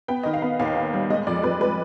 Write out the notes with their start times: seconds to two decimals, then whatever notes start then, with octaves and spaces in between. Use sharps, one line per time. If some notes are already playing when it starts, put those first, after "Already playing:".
0.08 B3 G5
0.23 D#3 D#5
0.34 F5
0.42 B3
0.59 D#2 F5
0.76 D#3
0.93 G3
1.10 G#3 D#5
1.27 F2 D5
1.43 F2 B4
1.61 G#3 B4